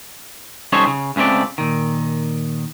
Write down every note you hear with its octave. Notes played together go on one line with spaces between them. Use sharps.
G3 C#4 D#4 A4 C5 C#5
C#3
C#2 C#3 A3 C4 D5
A#2 D#3